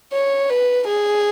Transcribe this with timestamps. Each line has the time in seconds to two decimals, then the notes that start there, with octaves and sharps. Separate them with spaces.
0.13 C#5
0.50 B4
0.88 G#4